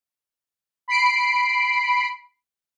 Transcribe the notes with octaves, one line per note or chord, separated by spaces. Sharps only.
B5 C7 D7